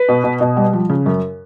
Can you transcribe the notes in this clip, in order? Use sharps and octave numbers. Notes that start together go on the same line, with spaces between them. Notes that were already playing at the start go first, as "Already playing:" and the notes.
Already playing: B4
B2
B2
B2
G3
F3
C#3
F#2